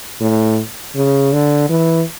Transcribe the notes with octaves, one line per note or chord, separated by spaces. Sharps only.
A2
C#3
D3
E3